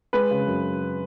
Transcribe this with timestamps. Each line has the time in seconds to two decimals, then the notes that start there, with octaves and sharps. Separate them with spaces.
0.13 G#3 B4
0.31 C#3
0.47 F#2